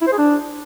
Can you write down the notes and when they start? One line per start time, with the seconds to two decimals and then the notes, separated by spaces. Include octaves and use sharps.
0.01 E4
0.07 C5
0.13 G#4
0.18 D4